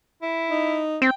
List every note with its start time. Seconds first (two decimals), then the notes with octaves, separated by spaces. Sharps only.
0.22 E4
0.49 D#4
1.02 C4 G5